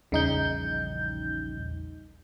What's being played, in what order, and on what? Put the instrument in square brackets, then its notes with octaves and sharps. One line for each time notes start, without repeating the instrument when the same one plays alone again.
[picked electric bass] A#1 E2 G3 [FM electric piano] C#3 D#4 G6